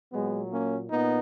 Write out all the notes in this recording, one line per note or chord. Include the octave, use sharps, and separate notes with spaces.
A#2 F#3 G#3 B3
A#3 C#4
A#2 B3 D#4